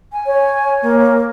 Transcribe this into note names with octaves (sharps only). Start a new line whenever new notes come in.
G#5
C#5
A#3